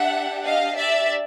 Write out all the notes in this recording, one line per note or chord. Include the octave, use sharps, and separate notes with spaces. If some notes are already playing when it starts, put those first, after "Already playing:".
Already playing: D4 G4 E5 F#5
D#5 F5
D5 E5